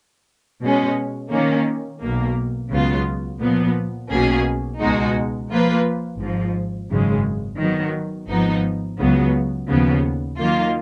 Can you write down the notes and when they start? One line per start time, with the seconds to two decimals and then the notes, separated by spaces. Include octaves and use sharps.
0.62 B2 G#3 C#4
1.31 D#3 A#3 C#4
2.01 B1 B2 A#3
2.71 C#2 C#3 F#3 B3 F4
3.40 A#2 F3 B3
4.10 B1 B2 A#3 C#4 G#4
4.80 C#2 B2 G#3 D#4 F#4
5.50 F3 A#3 F4 B4
6.19 G#1 G#2 F3
6.89 G#1 F#2 C#3 G#3
7.59 D#3 F#3 B3
8.28 G#1 G#2 F3 B3 D#4
8.98 C#2 C#3 F#3 B3
9.68 D#2 C#3 F3 B3
10.37 D#3 F#3 A#3 F4